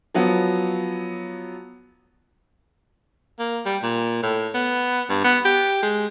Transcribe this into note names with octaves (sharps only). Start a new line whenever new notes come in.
F3 F#3 B3
A#3
G3
A#2
A2
B3
G2
B3
G4
G#3